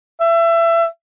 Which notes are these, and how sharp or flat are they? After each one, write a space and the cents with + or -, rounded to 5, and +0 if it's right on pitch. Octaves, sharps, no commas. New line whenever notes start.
E5 +25